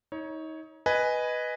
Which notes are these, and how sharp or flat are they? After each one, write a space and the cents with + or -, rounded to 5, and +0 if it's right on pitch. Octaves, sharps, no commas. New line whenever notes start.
D#4 +30 C#5 +0
B4 +0 D#5 +0 G#5 +0